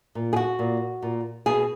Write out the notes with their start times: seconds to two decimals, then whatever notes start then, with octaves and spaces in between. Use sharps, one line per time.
0.15 A#2
0.33 G#4
0.36 F#4
0.59 A#2
1.02 A#2
1.46 B2 G#4